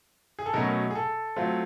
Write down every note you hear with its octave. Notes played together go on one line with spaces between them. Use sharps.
G#4
A4
B2 F#3 A3 C#4 A#4
G#4
A4
F#3 A3 C4 F4